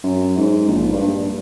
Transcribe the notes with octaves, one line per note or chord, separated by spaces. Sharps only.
F#2
G#2
A#1
G2
G2